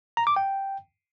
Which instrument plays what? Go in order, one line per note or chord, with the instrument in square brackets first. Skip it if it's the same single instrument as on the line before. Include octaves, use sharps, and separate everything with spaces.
[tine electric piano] A#5
D6
G5